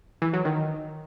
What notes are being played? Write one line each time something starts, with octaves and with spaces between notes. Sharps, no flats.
E3
F#3
D#3